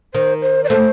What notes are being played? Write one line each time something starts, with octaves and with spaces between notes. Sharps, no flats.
D#3 C5
C5
D5
A3 C5